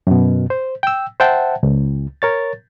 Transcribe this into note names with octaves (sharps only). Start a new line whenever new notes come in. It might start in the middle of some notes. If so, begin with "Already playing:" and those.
F#2 B2
C5
G5 E6
C5 E5 F#5 G5 A5
C#2
A#4 C#5 A6